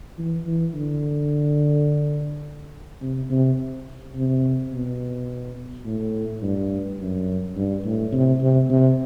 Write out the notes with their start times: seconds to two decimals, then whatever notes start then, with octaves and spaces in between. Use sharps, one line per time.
0.18 E3
0.47 E3
0.75 D3
3.02 C3
3.31 C3
4.15 C3
4.73 B2
5.86 A2
6.42 G2
7.00 F#2
7.57 G2
7.85 A2
8.13 C3
8.41 C3
8.70 C3